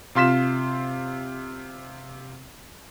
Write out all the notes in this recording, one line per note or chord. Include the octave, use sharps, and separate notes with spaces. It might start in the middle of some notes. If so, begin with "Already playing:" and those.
C3 F4 C6 B6 E7